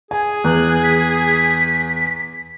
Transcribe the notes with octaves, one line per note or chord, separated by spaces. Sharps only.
G#4 G#5
E2 F#6
B6